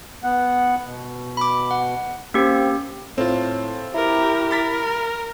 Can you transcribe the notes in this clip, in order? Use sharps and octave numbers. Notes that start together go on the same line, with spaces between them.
B3 F#5
B2
B5 D6
F#5
A#3 C4 C#4 G4
A2 C4 F4
E4 G4 A#4
A#4 B5 A6 B6